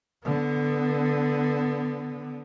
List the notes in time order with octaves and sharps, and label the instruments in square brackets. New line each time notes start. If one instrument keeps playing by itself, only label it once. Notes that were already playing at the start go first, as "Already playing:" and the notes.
[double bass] D3 B3